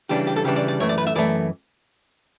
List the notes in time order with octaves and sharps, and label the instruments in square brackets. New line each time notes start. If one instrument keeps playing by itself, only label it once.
[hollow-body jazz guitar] C#3 E3 G3 D4 G4
G4
A4
C#3 E3 G3 D4 G4
D5
D5
F#2 E3 A3 C#5
D5
B4
E5
F#2 E3 A3 D5